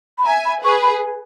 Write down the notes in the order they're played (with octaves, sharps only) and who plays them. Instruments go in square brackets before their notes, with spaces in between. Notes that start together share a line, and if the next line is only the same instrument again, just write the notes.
[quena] B5
[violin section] E5 G#5 [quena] A#5
[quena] B5
[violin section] G#4 B4 [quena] C#6
[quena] B5